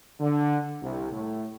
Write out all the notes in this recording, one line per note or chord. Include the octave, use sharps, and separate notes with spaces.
D3
C2
A2